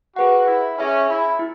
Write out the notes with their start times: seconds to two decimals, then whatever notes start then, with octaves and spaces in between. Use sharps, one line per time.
0.16 F#4 G#4 B4 F#5
0.47 E4
0.78 C#4 G#4 E5 G#5
1.08 E4
1.39 E4